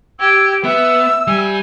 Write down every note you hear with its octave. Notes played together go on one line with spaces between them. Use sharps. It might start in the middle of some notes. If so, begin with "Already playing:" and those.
G4 E6 G#6
B3 E5 E6
G3 G#5